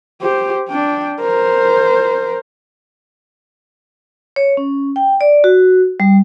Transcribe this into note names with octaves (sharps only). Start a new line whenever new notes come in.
G4 C5
D4 G5
A#4 C5
C#5
C#4
G5
D5
F#4
G3